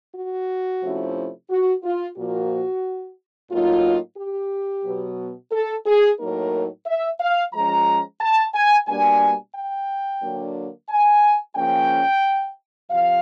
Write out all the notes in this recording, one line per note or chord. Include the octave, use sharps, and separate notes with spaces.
F#4
C3 F3 A3 C#4 E4
F#4
F4
A#2 F3 A#3 F#4
A2 F#3 A#3 D#4 F4
G4
B2 F#3 B3
A4
G#4
A2 F#3 A#3 D#4 A#4
E5
F5
F3 G#3 C#4 A#5
A5
G#5
B2 G3 A#3 D4 G#5
G5
D3 F#3 A#3 D4
G#5
C#3 F3 A#3 C#4 G5
C3 F3 F5